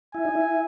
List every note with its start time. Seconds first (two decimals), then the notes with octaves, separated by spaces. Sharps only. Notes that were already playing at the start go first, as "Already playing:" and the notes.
0.14 E4 G#5
0.25 D#4
0.35 E4